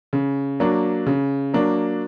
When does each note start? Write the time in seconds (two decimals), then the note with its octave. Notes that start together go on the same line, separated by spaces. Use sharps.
0.13 C#3
0.60 F#3 A#3 D4
1.06 C#3
1.54 F#3 A#3 D4